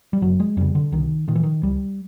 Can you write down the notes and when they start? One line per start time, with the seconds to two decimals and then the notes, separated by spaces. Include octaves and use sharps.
0.13 G3
0.22 F#1 F#3
0.40 G#3
0.57 F2 C#3 G3
0.75 D3
0.92 C2 D#3
1.28 A#2 D#3
1.35 E3
1.43 D#3
1.63 C#2 G3